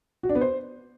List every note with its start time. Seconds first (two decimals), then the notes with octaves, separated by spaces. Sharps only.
0.23 F#4
0.29 D4
0.35 B3
0.41 C5